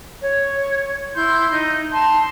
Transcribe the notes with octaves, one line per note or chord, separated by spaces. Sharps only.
C#5
E4 C6 G6
D#4
A5 C6